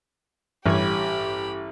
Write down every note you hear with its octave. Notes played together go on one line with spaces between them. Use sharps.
A1 G2 G4 C#5 B5 G#6